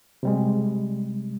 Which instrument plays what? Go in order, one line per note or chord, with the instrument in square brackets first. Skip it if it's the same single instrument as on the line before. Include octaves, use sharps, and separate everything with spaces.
[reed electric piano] C3 G3 G#3